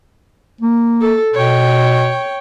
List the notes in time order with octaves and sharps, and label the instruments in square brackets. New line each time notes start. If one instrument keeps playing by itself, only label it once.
[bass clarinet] A#3
[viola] A4
[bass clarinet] B2 [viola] C#5 G5